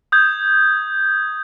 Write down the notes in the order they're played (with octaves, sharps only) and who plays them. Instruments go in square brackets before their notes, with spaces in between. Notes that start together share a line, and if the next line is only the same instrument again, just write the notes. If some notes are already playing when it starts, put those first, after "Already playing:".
[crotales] D#6 G6 G#6